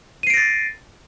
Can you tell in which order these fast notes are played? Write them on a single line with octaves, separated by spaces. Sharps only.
D#7 C7 D7 A#6 A6